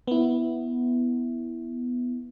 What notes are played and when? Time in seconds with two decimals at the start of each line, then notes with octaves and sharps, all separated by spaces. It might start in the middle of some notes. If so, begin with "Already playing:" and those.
0.07 B3 E4